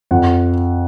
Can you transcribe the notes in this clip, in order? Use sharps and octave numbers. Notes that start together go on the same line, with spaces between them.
F2 F#5